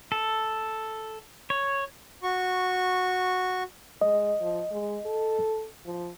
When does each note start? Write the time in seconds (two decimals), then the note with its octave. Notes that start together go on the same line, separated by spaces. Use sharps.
0.12 A4
1.50 C#5
2.23 F#4 C#6
4.01 G#3 D#5
4.41 F3
4.71 G#3
5.05 A4
5.86 F3